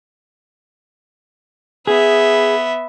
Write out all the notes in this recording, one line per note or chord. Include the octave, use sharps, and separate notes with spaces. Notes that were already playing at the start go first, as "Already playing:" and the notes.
B3 G#4 E5